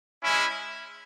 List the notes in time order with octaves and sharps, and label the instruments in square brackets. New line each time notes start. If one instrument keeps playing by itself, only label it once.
[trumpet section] G#3 C#4 E4